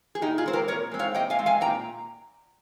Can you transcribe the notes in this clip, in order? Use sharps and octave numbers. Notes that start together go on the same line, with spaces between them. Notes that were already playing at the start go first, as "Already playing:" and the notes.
G#4
A#2 D#4 G4
F4 G#4
G#3 C4 C5
G4 A#4
A#2 A#4 C#5
G#3 C4
C#5 F5
A#2 D#5 G5
F5 G#5
G#3 C4
F5 G#5
A#2 G5 A#5